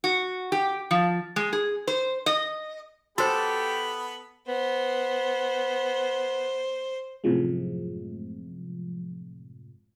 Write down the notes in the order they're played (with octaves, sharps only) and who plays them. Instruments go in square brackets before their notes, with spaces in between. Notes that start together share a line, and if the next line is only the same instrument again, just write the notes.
[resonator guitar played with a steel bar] F#4
G4
F3
G#3
G#4
C5
D#5
[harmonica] B3 B5 [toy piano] F#4 C5 [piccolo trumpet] G4 [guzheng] A4
[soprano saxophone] B3 [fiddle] C5
[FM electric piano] F#2 A2 C3 F3 G#3